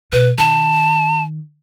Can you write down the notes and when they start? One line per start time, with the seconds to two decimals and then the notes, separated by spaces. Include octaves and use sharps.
0.12 B2 B4
0.38 D#3 A5